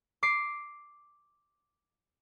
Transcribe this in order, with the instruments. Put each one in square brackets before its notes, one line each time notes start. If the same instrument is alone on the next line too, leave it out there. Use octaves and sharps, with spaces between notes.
[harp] D6 C7